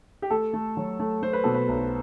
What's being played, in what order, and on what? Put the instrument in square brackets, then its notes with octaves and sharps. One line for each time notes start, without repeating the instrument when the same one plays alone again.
[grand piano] G4
A3 A4
A3
F#3
A3
A3 C5
B4
B2 A4
B4
B1